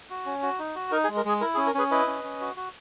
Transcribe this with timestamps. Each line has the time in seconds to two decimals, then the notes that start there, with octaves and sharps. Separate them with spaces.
0.10 F#4
0.26 C#4
0.43 F#4
0.59 D#4
0.75 F#4
0.91 D#4 A#4
1.04 G#4
1.09 G#3
1.17 A#4
1.25 G#3 G#4
1.41 E4 A#4
1.54 G#4
1.57 C#4
1.67 A#4
1.74 C#4 G#4 B4
1.91 E4 B4 D#5
2.07 C#4
2.24 C#4
2.41 F#4
2.57 F#4